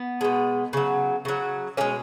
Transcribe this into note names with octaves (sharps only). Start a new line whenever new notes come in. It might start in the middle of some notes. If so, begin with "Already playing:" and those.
Already playing: B3
B2 G#3
C#3 F#3
C#3 F#3
B2 G#3 A#3 C#4